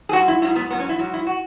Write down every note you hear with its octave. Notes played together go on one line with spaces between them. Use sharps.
G#4
F#3 F#4
G#2
E4
G#2 F#3 E4
B3
G#2 F#3 B3
C#4
E4
G#2 F#3
E4
F#4